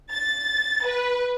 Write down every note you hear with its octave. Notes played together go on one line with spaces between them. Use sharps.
A6
B4